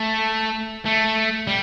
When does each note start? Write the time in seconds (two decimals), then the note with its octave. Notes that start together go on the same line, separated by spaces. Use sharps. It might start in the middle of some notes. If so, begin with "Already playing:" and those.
Already playing: A3
0.85 A3
1.47 G3